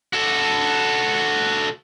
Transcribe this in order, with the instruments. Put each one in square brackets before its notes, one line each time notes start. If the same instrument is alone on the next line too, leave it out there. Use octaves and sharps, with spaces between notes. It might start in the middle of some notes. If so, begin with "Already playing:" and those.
[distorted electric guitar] F#4 A4